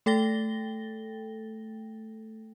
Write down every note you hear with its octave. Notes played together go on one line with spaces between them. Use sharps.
A3 A4 G5 A6 A#6 G7